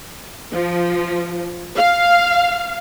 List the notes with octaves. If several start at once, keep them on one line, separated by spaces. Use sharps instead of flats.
F3
F5